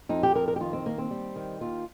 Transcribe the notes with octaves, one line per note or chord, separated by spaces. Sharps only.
F2 D#4
G4
F2 A#4
A#4
G4
D#3 F4
C4
D#2 A#3
C4
G3
D#3
D#2 F4